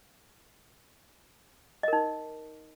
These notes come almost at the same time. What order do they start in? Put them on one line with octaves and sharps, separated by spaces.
D#5 A#4 D#4